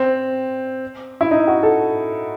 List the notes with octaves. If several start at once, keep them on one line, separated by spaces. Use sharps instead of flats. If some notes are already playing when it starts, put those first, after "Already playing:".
Already playing: C4
E4
D#4
F#4
A4